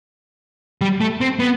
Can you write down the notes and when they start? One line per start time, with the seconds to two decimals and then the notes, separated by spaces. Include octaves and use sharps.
0.81 G3
1.01 A3
1.21 C4
1.39 B3